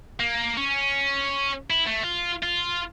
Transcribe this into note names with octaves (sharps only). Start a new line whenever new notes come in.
A#3
C#4
E4
A3
F4
F4